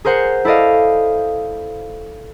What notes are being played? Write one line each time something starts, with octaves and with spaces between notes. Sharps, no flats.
G#4 A#4 C5 F#5
E4 A4 D5 D#5 F5